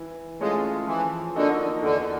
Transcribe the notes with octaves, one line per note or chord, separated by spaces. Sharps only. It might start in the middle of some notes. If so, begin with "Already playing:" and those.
Already playing: E3
G#3 A3 C#4 F4 G#4
E3 F3
D3 A#3 D#4 F#4 A4
E2 D3